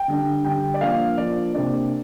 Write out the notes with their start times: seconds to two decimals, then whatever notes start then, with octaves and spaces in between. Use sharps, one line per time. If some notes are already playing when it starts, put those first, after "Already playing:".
Already playing: G5
0.08 D3 G3 D4
0.45 D3 G3 D4 G5
0.74 D5
0.81 F3 A#3 D4 F5
1.18 F3 A#3 D4 D5
1.54 C3 A#3 D4 D5